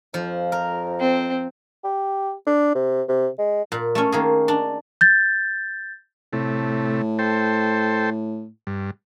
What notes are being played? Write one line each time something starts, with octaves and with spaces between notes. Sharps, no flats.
F2 F3
A#4
C4
G4
D4
C3
C3
G#3
A#2
A3 C#4
D#3 A#3 G#4
D4
G6 A6
A2 C3 A3
A4 C5 G5
G2